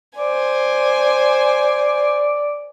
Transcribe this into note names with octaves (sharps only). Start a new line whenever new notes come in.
C5 D5 G#5